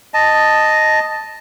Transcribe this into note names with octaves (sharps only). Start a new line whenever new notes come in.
D#5 A5